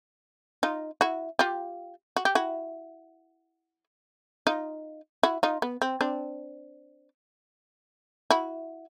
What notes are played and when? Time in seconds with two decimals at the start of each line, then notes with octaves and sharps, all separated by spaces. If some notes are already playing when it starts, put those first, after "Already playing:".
0.63 D#4 F4
1.01 E4 F#4
1.39 F4 G4
2.16 F#4
2.25 G4
2.35 E4 F#4
4.47 D#4 F4
5.23 E4 F#4
5.43 D#4 F4
5.62 B3
5.82 C4
6.01 C4 D4
8.30 E4 F#4